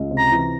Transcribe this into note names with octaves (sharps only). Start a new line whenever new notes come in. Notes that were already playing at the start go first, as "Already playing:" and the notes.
Already playing: C#2
C3
A#5
E3